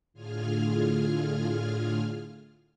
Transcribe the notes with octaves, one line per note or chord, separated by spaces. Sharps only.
A2 D3 F4 G#4 G#5 F6